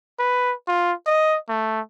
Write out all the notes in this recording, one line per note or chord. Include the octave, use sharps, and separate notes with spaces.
B4
F4
D#5
A3